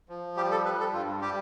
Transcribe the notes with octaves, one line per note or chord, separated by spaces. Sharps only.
F3
G3 G4
A4
G3 B4
A4
G2 F4
G3 G4